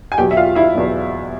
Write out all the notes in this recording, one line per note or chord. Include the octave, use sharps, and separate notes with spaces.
G#5
E2 B2 F#3 G4 G5
E5
F4 F5
E4 E5
E2 B2 F#3